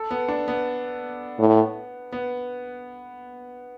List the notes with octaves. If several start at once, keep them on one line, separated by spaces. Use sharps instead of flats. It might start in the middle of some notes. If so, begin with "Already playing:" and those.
Already playing: A4
B3
D4
B3
A2
B3